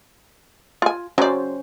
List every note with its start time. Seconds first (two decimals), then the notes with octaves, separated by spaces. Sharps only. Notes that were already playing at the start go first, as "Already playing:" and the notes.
0.82 F4 G#5
1.18 F#3 C#4 C5 D5